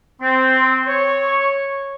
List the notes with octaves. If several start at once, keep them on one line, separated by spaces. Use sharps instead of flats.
C4
C#5